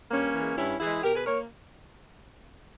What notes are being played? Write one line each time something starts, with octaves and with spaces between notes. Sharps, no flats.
G2 A#3 C#4
E3
G#3
G2 C#4 E4
E3 G#3 E4 G#4
B2 G4 A#4
G#4 B4
A#3 A#4 C#5